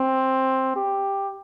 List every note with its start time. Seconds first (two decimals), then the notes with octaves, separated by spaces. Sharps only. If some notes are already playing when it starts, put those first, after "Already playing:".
Already playing: C4
0.76 G4